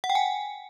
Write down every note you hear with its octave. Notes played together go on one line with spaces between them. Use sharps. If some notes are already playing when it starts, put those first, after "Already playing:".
F#5
G5
G#5